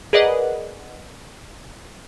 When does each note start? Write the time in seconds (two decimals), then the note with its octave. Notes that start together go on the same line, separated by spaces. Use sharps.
0.13 G#4 A#4 B4 D5 D#5 F#5